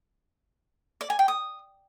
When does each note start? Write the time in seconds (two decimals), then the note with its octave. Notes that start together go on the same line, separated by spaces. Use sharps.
1.01 D5
1.10 G#5
1.19 G5
1.28 D#6